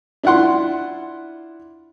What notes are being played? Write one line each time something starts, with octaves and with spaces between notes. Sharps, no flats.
D4 E4 F4 F#5 C6